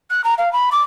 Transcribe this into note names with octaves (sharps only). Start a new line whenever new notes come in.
F#6
A#5
F5
B5
D6